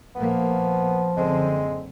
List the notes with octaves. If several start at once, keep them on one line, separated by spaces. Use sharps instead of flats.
A#1 F3 A#3 B3
F#1 D3 G#3 C4